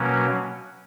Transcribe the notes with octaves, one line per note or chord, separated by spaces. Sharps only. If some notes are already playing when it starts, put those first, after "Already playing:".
Already playing: B2 F#3 A#3 C#4